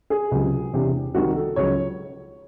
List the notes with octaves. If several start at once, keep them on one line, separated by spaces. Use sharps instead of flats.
G#4
C#2 C3 F#3
E1 E2 C3
C2 C3 D#3 F#4
A4
C#2 C#3 F#3 C#5